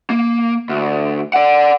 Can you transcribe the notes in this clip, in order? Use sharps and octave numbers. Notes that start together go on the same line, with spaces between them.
A#3
D2
D5 F#5